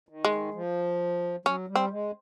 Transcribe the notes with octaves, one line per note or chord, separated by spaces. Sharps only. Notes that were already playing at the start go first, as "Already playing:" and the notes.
D#3
G#3
F3
F#3 C#4
G3
C4
G#3